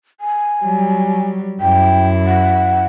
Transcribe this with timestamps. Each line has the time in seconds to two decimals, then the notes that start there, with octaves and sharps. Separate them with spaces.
0.20 G#5
0.64 F#3 G3
1.61 F#2 E4 G5
2.27 F#5